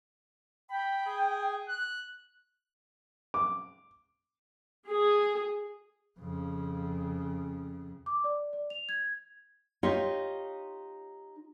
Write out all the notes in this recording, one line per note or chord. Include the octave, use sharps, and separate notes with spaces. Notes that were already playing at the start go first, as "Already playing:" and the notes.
G5 B5
G#4
F#6
D6
G#4
F2 C#3
D6
D5
D5
F7
G#6
D#4 F4 G4 C#5